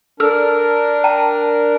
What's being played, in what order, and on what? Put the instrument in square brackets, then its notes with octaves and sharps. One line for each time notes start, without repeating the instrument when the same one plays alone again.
[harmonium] D4 A#4 [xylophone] A4 E6 F6
[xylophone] G5 A5 A#5